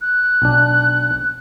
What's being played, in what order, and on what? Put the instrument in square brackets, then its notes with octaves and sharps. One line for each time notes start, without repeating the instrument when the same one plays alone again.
[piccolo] F#6
[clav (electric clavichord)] B1 D4